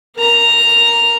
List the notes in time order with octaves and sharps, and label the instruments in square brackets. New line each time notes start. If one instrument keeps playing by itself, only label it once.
[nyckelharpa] A#4 A#5